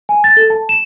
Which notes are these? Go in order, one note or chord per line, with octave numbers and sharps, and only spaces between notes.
G#5
A6
A4
A5
E7